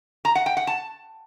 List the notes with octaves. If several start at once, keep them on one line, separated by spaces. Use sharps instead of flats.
A#5
F#5
G5
F#5
A5